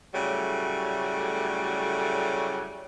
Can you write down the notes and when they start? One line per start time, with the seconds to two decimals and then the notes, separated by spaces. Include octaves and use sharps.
0.13 A2 C#3 F#3 G3 A3